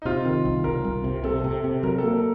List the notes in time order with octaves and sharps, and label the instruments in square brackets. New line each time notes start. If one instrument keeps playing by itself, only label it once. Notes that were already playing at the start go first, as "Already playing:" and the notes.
[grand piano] D#4
[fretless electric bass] C3 [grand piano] F4
[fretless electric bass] D#3
C2
[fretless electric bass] C2 [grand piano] A#4
[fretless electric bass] C2
C3
[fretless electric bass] C3 [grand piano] A4
[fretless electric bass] C3
C3
[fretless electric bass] F#3 [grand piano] A#4
[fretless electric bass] A#3 [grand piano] A4
[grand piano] A#4